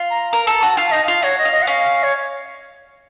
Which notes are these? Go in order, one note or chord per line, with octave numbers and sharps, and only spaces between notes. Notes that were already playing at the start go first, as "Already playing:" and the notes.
Already playing: F4
A#5
A#4 A#5
A4
A5
F#4
F4 F5
D#4 D#5
F4 F5
F#4 C#5
D#5
F4
D#5
F#5
C#4 F5
C#5